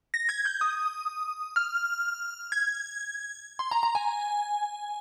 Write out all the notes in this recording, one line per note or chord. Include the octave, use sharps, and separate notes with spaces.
A#6
G#6
G6
D#6
F6
G#6
C6
A#5
A#5
G#5